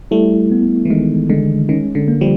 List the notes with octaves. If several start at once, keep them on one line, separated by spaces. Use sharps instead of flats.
G3 A3 E4
B3
E3
D#3 G#3
D3 G#3
D#3 C#4
D3
A#3
F3 G3